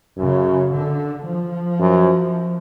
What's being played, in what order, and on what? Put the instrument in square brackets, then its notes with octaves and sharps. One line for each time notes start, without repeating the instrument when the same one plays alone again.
[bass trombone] F#2 [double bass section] C#3
[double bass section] D3
F3
[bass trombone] F#2